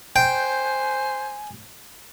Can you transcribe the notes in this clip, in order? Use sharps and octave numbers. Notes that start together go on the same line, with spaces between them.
C5 G5 G#5